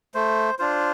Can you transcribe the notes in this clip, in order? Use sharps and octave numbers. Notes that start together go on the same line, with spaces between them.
A3 C5
D4 F4 C5